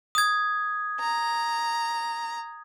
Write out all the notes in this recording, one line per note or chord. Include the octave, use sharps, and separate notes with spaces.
D#6 G#6
A#5